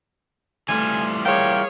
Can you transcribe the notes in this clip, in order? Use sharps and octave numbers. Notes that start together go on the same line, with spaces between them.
E3 G3 A3 F4 G#5
A#3 G#4 C#5 G5